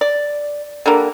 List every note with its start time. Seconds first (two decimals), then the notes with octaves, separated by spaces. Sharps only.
0.01 D5
0.86 D3 G3 A#3